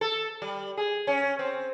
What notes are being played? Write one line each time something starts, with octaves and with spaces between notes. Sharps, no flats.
A4
G3
G#4
C#4
C4